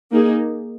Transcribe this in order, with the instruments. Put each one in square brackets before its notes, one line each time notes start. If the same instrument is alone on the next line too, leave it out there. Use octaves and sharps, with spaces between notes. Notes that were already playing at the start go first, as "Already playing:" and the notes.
[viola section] A#3 D#4 G#4